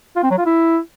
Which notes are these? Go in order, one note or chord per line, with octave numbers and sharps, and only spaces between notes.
F4
C4
F#3
F4
E4